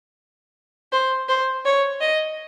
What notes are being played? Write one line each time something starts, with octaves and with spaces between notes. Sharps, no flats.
C5
C5
C#5
D#5